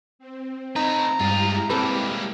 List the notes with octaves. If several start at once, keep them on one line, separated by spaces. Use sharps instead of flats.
C4
A3 D#4 B4 A#5
G2 G#3 E4 F4 G4 G#4
G3 A#3 C4 A4 B4